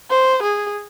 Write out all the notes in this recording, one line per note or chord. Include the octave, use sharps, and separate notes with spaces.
C5
G#4